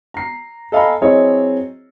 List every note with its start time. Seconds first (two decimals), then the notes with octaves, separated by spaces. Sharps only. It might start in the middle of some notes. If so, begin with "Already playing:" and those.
0.14 A#5 C7
0.72 A4 D#5 F5 G#5 A#5 B5
1.01 F#3 C4 E4 G#4 C#5 D#5